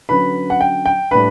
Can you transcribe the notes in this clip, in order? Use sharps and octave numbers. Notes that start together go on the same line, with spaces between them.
D3 F#3 C#4 B4 B5
F#5
G5
G5
A2 G3 D4 B4 B5